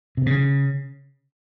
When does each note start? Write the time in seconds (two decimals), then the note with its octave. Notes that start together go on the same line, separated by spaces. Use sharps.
0.17 C3
0.26 C#3